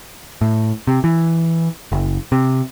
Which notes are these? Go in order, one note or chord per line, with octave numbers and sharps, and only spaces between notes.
A2
C3
E3
F#1
C3